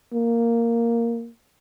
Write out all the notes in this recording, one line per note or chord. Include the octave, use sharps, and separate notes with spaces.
A#3